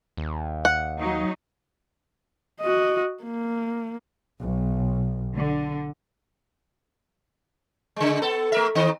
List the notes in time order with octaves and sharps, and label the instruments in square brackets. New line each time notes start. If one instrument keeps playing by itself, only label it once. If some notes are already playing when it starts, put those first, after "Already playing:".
[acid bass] D#2
[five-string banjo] F#5
[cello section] F#3 D#4
[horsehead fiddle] F#4 D#5
A#3
[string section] B1
D3
[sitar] C#3 G#3
B3 A4
A3 A#4 E5
D#3 C4 D#5